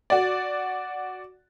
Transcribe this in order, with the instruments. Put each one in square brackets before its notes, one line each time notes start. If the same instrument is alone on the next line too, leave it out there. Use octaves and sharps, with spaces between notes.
[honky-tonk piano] F#4 D5